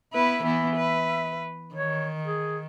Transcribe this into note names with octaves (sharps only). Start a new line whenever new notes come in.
B3 E4 B4 E5
E3 B3 E4
B4
D#3 C#5
G#4